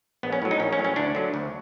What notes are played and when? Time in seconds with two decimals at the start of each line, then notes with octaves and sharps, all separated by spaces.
0.23 A#1 B3
0.32 C#4
0.42 A2 F#3
0.51 D#4
0.60 A#1 C#4
0.73 C#4
0.78 A2 F#3
0.85 C#4
0.96 D2 D4
1.15 D3 F#3
1.34 D2